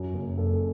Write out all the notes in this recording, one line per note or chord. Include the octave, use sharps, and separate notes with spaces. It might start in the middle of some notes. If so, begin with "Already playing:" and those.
Already playing: F#2
F#1
F#1 A4